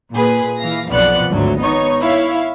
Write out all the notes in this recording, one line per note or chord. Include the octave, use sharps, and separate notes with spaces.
A#2 G#4 B4
E3 F5 A#6
B1 F2 B3 D5 F#6 C#7
G#1 D2 F#3
B3 D#4 C#5 C#6
E4 C#5 E5 F5